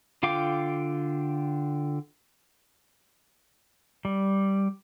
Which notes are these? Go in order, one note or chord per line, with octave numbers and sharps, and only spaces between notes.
D3 F4 F5 G5 D6
G3